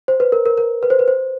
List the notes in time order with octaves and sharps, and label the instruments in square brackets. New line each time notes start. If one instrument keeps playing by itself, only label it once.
[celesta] C5
B4
A#4
A#4
A#4
B4
C5
B4
C5